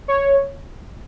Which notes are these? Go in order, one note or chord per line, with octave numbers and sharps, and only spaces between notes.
C#5